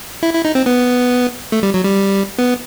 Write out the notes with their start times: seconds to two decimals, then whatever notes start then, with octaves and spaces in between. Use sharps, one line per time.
0.23 E4
0.33 E4
0.45 D#4
0.55 C4
0.66 B3
1.52 A3
1.63 G3
1.74 F#3
1.84 G3
2.39 B3